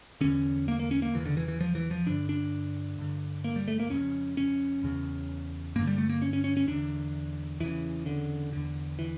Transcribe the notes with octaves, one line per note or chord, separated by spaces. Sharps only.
E2 D3 C#4
A#3
A#3
C#4
A#3
E2 C#3 E3
D3
E3
E3
F3
E3
F3
G2 D3 D4
D4
G2 D3
A#3
G3
A3
A#3
F2 C#3 C#4
C#4
E2 C#3
G2 D3 A#3
G3
A3
A#3
C#4
C#4
C#4
C#4
E2 D3 D4
E2 C#3 E3
D3
E2 D3
E3